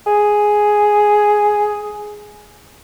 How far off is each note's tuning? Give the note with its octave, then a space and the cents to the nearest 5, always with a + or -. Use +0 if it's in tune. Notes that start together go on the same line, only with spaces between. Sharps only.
G#4 +5